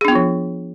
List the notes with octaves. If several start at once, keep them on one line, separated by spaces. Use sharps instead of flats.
F3 B3 D4 F4 G#4